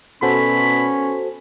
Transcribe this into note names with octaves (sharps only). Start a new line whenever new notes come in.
B2 C#4 F#4 A4 C5 B5